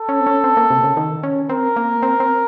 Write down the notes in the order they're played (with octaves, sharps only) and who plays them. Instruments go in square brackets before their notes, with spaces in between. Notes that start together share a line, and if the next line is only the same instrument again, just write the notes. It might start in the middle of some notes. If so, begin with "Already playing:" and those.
Already playing: [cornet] A4
[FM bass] C#4
C4
C#4
C4
A#3
C3
C#3
D#3
C#4
[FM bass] C4 [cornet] A#4
[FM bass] A#3
C4
C4